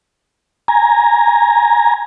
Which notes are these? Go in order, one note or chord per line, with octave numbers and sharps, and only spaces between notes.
G#5 A#5